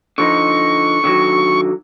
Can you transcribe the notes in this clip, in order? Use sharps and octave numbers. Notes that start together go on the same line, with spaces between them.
D3 F3 D#4 C#6
D3 D#3 F#3